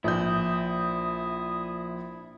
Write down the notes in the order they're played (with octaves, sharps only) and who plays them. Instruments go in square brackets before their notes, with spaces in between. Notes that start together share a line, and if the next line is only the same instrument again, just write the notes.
[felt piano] A#1 G6 [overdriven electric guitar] E4 [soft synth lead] D#6